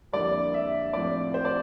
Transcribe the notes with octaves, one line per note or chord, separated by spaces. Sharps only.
F2 D3 G3 A#3 E4 D5
E5
A2 F3 C4 E4 D5
C5
D5